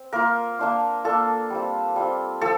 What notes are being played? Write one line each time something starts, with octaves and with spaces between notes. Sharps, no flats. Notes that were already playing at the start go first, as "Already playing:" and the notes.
Already playing: C4
A#3 F4 A#4
A#3 D4 F4
A#3 D4 F4 A4
G3 C4 F4
G3 C4 F4
F3 C4 A4